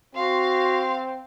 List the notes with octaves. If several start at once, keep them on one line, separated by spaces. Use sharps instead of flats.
C4 F#4 F5 C6